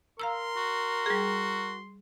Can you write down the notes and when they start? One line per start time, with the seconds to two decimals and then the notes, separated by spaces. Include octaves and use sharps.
0.20 A#4 F5 A#5 C6 E6
0.57 F#4
1.06 G3 G#4